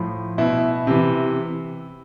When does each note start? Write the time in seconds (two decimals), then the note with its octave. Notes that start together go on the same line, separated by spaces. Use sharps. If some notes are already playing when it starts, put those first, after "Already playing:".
Already playing: A2 F3
0.38 B2 E4
0.87 C3 E3